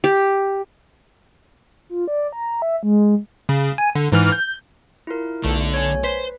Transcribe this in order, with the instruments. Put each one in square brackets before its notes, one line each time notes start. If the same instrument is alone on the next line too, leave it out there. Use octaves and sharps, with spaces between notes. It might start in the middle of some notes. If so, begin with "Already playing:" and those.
[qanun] G4
[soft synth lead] F4
D5
A#5
E5
G#3
[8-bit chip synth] C#3
G#5
D3
G#2 E3 F6
G6
[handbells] E4 F4 A#4
[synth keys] B1 A3 [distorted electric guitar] D3
[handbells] C#5 G#5
[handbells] B4 [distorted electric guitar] C5 [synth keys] B6